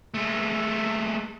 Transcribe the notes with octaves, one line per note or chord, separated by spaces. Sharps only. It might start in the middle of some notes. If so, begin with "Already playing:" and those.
G#3 A3